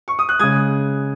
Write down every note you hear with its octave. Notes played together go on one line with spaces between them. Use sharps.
C#6
D#6
F#6
C#3 G#3 D#6 G#6